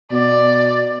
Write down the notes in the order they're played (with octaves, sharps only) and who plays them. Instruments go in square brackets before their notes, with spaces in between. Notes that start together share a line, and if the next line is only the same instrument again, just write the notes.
[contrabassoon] B2 [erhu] D5